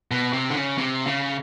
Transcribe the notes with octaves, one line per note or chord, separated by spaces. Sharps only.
B2
C3
D3
C#3
C3
C#3